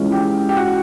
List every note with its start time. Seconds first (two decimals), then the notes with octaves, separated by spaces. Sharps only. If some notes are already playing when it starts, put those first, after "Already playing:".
Already playing: E3 G#3 C#4 F4
0.12 G4
0.49 G4
0.57 F#4